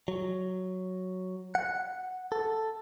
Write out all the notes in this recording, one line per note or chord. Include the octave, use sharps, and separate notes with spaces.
F#3
F#5
A4